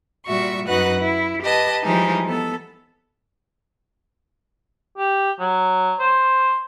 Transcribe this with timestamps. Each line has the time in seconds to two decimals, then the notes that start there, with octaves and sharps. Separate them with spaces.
0.25 A#2 G3 F#4 E5 C#6
0.67 F#2 D#4 F#4 B4 F#5 F#6
0.99 E4
1.41 G4 B4 D#5 A5
1.83 E3 F3 G3 G#3 D#4
2.25 B3 A4
4.98 G4
5.40 F#3
5.99 C5